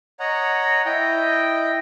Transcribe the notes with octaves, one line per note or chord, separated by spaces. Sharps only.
C#5 D#5 F#5 A#5
E4 D#5 G5